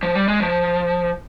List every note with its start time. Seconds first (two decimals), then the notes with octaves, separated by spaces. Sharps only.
0.03 F3
0.15 G3
0.28 G#3
0.40 F3